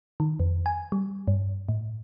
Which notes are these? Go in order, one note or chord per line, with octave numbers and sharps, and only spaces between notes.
D#3
F2
G#5
G3
G2
A2